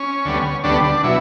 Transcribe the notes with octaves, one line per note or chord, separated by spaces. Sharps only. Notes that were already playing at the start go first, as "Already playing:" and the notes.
Already playing: C#4
D2 D3 G3 B3
D2 D3 G3 B3 D4
D4
B2 F#3 E4